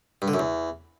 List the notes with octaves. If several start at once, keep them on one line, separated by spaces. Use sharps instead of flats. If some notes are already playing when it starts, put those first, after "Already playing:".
G2
D3
F#2
E2